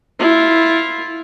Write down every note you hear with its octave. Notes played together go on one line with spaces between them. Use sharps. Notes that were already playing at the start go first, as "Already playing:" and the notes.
E4 F4